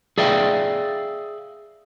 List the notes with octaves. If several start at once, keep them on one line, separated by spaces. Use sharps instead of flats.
G#4 D5 E5 F5 G5